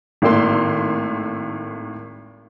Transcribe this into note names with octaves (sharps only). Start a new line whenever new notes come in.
G#1 A2 A#3 C6